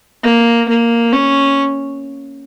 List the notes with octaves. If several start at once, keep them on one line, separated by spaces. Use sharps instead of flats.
A#3
A#3
C#4